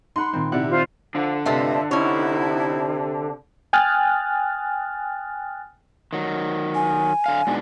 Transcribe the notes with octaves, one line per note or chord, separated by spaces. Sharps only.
D#4 F#5 B5 C6
A#2 D#3 C4
C3 E4 D5 F#5
F4 C5
D3 F3
G2 C3 A3 C4 F4 D#5 E5
C3 C#4 D#4 E4 C#5
G5 G#5 D#6 F6 F#6 A6
D#3 F#3
G#5
D3 F5
G#2 B2 D4